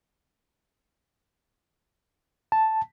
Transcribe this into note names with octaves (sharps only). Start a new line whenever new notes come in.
A5